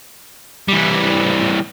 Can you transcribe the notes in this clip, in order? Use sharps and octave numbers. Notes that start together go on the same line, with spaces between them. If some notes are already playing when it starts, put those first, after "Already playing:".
E3 G3